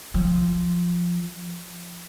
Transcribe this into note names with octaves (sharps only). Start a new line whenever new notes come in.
F3